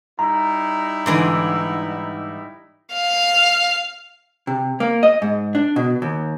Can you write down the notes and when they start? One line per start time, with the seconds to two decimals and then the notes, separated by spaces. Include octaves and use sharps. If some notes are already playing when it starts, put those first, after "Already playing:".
0.19 G3 D#4 E4 A#5
1.06 G#2 D3 E3
2.93 F5
4.47 C3
4.80 A#3
5.03 D#5
5.22 G#2
5.55 D4
5.76 B2
6.02 D#2